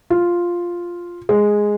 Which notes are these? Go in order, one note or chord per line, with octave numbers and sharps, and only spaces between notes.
F4
G#3